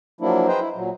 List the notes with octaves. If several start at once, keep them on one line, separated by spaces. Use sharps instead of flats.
F3 F#3 A#3 D4 E4
G#4 B4 C5 D#5 G5 A#5
E4
A#2 F#3